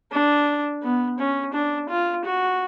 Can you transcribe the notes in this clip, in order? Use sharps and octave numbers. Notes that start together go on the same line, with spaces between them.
D4
B3
C#4
D4
F4
F#4